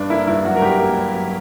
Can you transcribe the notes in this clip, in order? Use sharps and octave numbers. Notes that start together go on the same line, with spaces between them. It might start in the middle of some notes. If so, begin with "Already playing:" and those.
Already playing: G2 D4
A#3 E4
G2 E4
F#3 F#4
A#4
G2 G4
A#3
G2
F#3